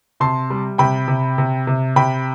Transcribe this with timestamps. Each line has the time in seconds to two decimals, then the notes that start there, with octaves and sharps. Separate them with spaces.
0.20 C3 A5 C6
0.50 G3
0.78 C3 G5 B5
1.08 C3
1.38 C3
1.67 C3
1.96 C3 G5 B5